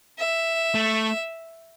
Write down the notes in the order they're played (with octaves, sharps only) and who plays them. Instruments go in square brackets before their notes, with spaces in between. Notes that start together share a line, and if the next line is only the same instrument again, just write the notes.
[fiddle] E5
[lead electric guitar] A3